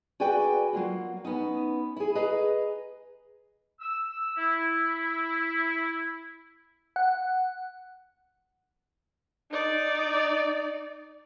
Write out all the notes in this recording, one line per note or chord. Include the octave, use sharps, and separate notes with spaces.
F#4 G#4 B4 D5 G5 G#5
F#3 A#3 F4 F#4
B3 C#4 D#4
E4 G#4
G#4 B4 D#5 A#5
E6
E4
F#5
D#4 D5